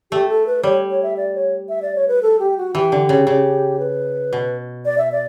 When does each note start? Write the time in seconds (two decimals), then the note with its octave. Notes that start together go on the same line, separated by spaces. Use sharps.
0.11 A3 G4
0.29 A4
0.47 B4
0.63 G3 C#5
0.90 C#5
1.03 E5
1.17 D5
1.35 C#5
1.69 E5
1.82 D5
1.95 C#5
2.08 B4
2.22 A4
2.39 G4
2.58 F#4
2.75 E3 G4
2.92 D3
3.09 C#3
3.27 C#3
3.79 B4
4.33 B2
4.85 D5
4.98 E5
5.12 D5